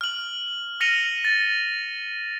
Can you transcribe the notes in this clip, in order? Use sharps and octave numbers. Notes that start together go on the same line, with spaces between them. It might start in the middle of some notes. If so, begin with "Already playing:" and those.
F6 F#7
F6 A#6 C#7 D#7 F7 G7
A6